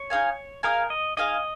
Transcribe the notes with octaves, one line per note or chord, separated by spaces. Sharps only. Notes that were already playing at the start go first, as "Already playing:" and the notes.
Already playing: C#5
D#4 G#4 F5 G#5
D#4 G#4 A#4 F5 G#5
D#5
D#4 G#4 D#5 F5